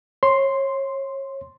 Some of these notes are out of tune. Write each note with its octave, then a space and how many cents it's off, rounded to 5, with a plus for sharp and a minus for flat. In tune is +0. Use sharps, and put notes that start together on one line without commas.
C#5 -30 C6 +0